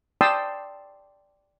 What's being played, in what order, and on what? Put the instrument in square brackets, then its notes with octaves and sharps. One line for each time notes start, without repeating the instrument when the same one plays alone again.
[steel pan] D5 G5 A5 C6 D#6 E6